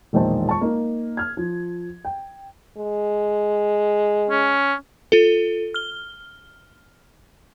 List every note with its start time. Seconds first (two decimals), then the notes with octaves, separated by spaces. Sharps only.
0.13 E1 A#1 D#3 C5 A5
0.49 A5 C#6
0.61 A#3 D#4
1.17 F6 G#6
1.37 F3
2.05 G5
2.77 G#3
4.30 C#4
5.12 F4 A4
5.74 F6 G7